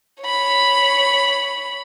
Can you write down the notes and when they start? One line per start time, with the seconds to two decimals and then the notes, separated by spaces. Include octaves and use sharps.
0.23 C#5 B5